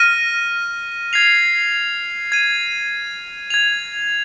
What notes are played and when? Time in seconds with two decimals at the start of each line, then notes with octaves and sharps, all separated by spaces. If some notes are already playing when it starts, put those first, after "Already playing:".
Already playing: F6 A#6 D#7
1.13 G#6 C7 F7
2.32 G#6 D#7
3.50 G#6 F7